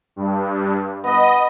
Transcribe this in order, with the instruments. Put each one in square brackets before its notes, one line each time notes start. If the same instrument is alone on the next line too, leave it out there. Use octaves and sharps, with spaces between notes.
[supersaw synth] G2
[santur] B3 B4 [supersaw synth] D#5